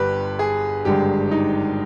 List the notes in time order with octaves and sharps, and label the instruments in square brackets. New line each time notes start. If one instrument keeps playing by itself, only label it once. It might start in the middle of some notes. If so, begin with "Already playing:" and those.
Already playing: [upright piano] G1 G2 D3 G4 B4
G#4
G#1 G2 D3 G#3 G4
D#4